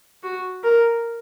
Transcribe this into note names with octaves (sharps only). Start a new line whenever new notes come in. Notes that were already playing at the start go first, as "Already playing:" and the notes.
F#4
A#4